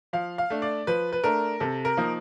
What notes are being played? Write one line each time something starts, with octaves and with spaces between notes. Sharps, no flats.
F3 F5
F5
A3 D4
D5
F3 B4
B4
A3 D4 A#4
C3 A4
A#4
F3 A#3 D#4